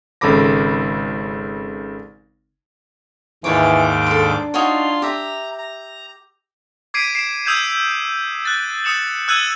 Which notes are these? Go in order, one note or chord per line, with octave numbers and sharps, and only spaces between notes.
G#1 C#3 A4 B5 D6 A#6
D#2 G#2 E3 C#5 D5 D6
D4 A4 C6
D#4 F4 F#4 C#5 C6
G4 E5 A#5
A#5
D6 G#6 B6 C7 D7 D#7
C7 D7 E7
D#6 E6 G6 G#6 D#7 E7
F#6 A6
D#6 C#7 E7 F#7
E6 F#6 G#6 D#7 F#7